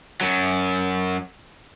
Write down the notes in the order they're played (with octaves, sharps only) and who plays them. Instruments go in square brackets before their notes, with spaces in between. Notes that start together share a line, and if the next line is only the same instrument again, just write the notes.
[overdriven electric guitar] F#2 F#3